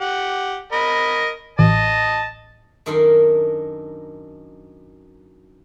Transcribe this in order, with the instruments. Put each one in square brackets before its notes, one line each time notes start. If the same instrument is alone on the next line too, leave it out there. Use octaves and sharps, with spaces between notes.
[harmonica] G4 F#5
A#4 D#5 B5
[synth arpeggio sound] A1 [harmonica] D#5 A5
[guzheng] F#2 D#3 D4 A4 A#4 C6